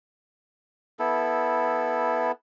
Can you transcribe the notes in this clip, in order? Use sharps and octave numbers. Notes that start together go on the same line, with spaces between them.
B3 E4 A4